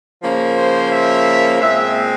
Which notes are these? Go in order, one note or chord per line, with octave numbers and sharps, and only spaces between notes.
C#3 F3 A#3
C5
E5
A#2 G#3 C4 E5